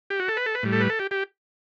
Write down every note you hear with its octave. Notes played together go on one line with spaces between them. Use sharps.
G4
F#4
A4
B4
A4
B4
A2 G3
A4
B4
A4
G4
G4